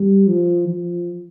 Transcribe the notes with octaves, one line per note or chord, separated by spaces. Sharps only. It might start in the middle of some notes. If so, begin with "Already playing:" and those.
Already playing: G3
F3
F3